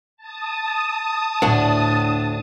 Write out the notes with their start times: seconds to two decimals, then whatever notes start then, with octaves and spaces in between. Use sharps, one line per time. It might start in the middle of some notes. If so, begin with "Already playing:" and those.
0.17 A5 D#6
1.42 D2 A2 D4